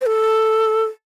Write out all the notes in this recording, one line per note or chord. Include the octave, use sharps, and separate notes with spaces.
C5
A4